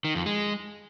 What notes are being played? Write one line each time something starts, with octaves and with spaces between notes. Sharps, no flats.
D#3
F2
G#3